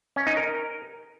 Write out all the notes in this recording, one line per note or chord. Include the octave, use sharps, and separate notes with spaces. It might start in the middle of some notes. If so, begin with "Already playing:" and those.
C#4
D#4
A#4